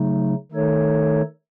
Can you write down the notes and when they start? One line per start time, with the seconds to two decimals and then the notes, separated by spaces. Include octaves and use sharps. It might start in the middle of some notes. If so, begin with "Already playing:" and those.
Already playing: C#3 F#3 A3 D#4
0.52 D#3 A3 D#4 A4 C#5